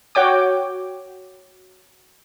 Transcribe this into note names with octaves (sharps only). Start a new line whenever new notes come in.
F#4 C#5 G5 D6